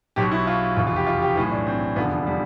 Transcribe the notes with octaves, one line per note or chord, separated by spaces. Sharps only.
B1 B2 G4
E4
F4
F1 E2 B2 F4
F4
G4
F4
G4
B1 A2 E3 F4
D4
C4
F1 E2 D3 F3 B3
G3